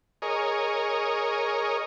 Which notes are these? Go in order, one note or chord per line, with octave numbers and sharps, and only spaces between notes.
G#4 A#4 C#5 D#5